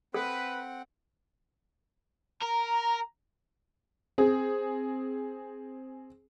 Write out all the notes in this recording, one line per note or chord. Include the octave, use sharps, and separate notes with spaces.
C4 A4 B4 F#5
A#4 A#5
C4 G#4